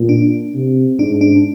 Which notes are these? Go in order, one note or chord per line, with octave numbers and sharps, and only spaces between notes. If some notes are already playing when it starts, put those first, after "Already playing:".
Already playing: A#2
D4
C3
G#2 D4
D4